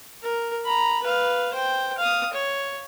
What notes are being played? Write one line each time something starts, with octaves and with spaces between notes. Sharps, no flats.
A#4
A#5 B5
B4 F5
C5 G5
F5 D#6
C#5